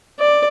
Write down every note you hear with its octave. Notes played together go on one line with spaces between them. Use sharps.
D5